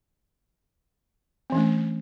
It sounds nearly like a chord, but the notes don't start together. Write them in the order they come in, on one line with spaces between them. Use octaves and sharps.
C4 E3 C#4 A3